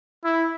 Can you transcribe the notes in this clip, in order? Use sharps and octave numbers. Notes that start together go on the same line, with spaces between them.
E4